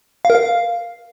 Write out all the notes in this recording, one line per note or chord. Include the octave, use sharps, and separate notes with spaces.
F5
A#4
F5